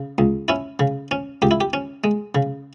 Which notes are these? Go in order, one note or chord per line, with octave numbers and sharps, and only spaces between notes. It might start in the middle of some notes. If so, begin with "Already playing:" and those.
Already playing: C#3
C#2
C#4 E4
C#3
C#4
C#2 G4
E4
G4
C#4
G#3
C#3